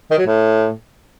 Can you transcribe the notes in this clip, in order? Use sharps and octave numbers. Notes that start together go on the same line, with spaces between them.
D#3
F#3
A2